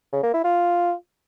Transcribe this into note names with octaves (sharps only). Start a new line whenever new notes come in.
C#3
A#3
E4
F4